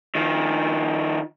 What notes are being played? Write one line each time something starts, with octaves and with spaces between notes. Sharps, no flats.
D#3 F3